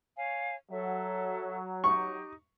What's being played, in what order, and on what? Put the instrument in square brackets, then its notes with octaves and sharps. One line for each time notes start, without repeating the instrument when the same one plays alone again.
[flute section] C#5 F5 G#5
[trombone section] F#3 [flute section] A4 E5
[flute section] D#4 G4 [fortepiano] C#6